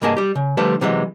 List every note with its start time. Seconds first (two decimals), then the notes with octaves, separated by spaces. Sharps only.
0.02 C2 G2 A#3 G#4 D#5 A5
0.17 G3 G4
0.35 C#3
0.57 D3 F3 G3 A3 B4 A5
0.81 C3 E3 F#3 G#3